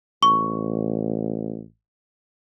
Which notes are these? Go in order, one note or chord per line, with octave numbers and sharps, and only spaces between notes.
A1 C#6